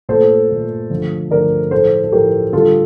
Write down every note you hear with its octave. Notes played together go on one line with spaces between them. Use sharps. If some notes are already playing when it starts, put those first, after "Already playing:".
A#2 A3 A4 C5
A#2 A3
D3 F3 A3
D3 F3 A3 A#4 D5
A2 F3 A3 A4 C5
A4
A2 F3 A3 G4 A#4
D3 G3 F4 A4